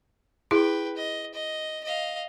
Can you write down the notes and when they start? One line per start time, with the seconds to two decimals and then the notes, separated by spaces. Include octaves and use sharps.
0.51 E4 G#4 B4 G5 C6
0.96 D#5
1.34 D#5
1.84 D#5 F5